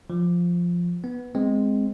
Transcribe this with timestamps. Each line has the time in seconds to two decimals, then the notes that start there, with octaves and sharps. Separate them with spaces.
0.10 F3
1.04 B3
1.35 G#3 C4